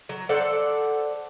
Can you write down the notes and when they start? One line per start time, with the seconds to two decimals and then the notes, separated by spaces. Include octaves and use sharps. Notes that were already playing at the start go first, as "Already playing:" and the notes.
0.09 F#3
0.29 A4 C5 D5 F#5